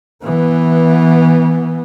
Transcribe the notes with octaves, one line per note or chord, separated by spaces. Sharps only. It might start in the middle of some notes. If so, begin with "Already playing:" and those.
E3 B3